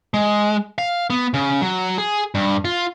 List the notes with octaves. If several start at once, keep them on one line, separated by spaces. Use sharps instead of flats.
G#3
F5
B3
C#3
F#3
G#4
G2
F4